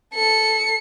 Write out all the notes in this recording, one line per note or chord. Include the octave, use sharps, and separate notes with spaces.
A4 C#7